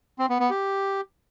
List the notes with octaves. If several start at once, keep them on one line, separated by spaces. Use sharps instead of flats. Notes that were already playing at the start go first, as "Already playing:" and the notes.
C4
B3
B3
G4